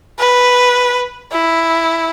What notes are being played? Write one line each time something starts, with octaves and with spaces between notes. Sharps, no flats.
B4
E4